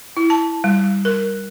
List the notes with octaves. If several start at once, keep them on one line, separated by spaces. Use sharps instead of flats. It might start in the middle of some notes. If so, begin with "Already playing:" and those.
E4
A5
G3
A#4